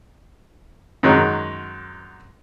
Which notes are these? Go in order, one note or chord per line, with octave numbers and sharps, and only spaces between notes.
F#2 D#3 F#3 G#3